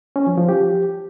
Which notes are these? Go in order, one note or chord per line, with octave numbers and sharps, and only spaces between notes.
C#4
F3
F3
G4